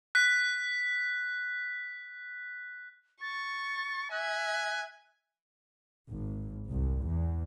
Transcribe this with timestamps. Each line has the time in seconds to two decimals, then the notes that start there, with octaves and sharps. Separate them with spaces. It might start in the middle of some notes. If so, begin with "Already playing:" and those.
0.15 F#6 B6
3.22 C#6 A6
4.11 E5 G#5 F#6
6.10 G#1
6.71 C2
7.05 E2